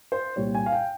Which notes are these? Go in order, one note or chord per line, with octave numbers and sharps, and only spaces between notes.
C5
C2 A#2 G3 C#5
G#5
F5
G5